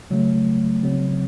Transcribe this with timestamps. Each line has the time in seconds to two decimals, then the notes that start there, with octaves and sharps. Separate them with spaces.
0.10 C#3 F#3 A3
0.83 C#3 F#3 C4